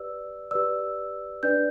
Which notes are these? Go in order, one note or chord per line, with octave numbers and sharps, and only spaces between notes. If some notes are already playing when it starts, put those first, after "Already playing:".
Already playing: G4 B4 D5 E6
G4 B4 D5 E6
D4 B4 D5 G6